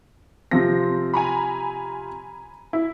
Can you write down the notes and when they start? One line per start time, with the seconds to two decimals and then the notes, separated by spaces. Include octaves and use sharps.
0.51 C3 F3 C4 A#6
1.14 G#5 A#5 B5
2.73 E4